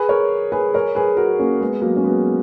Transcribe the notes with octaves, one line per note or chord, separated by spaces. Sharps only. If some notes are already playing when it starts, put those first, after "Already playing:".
Already playing: G#4 B4
A#4 C#5
G#4 B4
A#4 C#5
G#4 B4
F#4 A#4
A#3 C#4
G#3 B3
F#3 A#3
C#4
G#3 B3